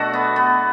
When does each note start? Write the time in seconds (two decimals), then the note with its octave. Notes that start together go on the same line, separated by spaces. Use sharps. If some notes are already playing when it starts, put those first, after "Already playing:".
Already playing: B2 A3 D4 F#4
0.13 B3
0.36 B3